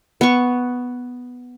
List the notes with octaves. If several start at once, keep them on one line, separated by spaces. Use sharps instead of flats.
B3 C#6